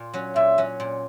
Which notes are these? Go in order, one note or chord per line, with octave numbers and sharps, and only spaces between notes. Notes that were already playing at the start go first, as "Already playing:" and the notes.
Already playing: A#2
F#3 C#4
A#2 E5
F#3 C#4
A#2